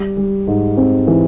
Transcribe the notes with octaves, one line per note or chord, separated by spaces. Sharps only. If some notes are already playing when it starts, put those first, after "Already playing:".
Already playing: G3
G3
G#2
C4
E3